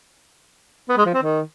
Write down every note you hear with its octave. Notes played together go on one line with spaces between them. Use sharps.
B3
G#3
F3
C4
D#3